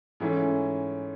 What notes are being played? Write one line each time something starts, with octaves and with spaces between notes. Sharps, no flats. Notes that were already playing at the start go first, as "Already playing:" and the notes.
G#2 E3 A3 C#4